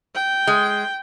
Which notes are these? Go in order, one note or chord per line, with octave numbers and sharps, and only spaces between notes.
G5
G#3